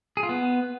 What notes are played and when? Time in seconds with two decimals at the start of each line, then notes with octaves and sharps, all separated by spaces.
0.17 G#4
0.23 F4
0.29 B3